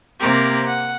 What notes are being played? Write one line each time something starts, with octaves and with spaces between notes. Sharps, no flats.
C3 A#3 C4 G4 A#4
F#5